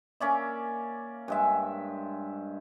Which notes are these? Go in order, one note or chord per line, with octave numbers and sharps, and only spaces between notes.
A#3 C#4 D5 E5
G2 G#3 E5